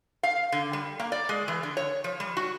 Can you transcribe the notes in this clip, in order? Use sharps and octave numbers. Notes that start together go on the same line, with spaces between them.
F5
D3
G3
A#3
D5
G#3
E3
D3
C#5
F3
G3
F#4